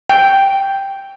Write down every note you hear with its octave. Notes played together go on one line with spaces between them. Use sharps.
G5